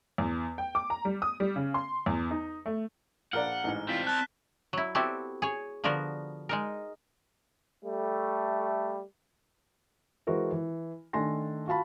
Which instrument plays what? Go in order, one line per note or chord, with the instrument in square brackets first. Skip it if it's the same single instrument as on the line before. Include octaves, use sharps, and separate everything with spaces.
[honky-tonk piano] E2
G5
D6
A#5
G3
D#6
G3
C#3
C6
E2
D#4
A3
[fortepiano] A#1 A#4 D5 [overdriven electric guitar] F#5 [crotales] F6
[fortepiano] A1 G#2
[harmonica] E3 F4 [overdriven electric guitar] C4 D5 [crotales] B6
[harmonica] A5 [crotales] F#6
[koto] F#3 E4
B3 C4 E4 F#4 G4 A4
G#4 C#5
D3 F3 B3 F#4 A#4
G#3 D#4 A#4
[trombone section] G3 A3
[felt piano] E3 G#3 F#4 A#4 C5
E3
D#3 A3 D4 G#5 C6 A#6
F4 F#4 F5 A5 B5